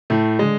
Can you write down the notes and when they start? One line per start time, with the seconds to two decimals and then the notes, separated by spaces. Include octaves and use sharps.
0.10 A2 A3
0.39 D3 G#3